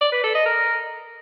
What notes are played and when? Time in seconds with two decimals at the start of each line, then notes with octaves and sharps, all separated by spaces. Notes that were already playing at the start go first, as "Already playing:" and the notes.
0.01 D5
0.12 B4
0.24 A4
0.35 D#5
0.46 A#4